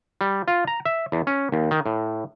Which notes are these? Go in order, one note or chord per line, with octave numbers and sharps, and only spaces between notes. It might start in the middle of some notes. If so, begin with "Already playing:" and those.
G3
F4
A#5
E5
E2
C#4
D#2
D#3
A2